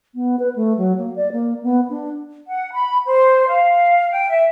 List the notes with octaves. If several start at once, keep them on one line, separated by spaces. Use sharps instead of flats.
B3
B4
A3
F#3
A#3
D5
A#3
B3
D4
F#5
B5
C5
F5
G5
E5